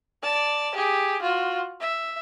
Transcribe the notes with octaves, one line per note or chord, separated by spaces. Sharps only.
D5 A5
G4 G#4
F4 F#4
E5